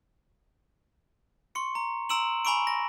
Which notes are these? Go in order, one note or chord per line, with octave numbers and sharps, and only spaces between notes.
C6 C#6 C#7
A#5
A#5 C6 E6 D7 E7 F#7
G#5 A#5 B5 C#6 E6 D7
A#6